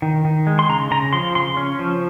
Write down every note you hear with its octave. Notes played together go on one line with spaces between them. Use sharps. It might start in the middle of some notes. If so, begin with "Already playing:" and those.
D#3
D#3
G#3
C6
C#3 A#5
C#3 A#5
F3 C6
C#3 C6
C#4
F3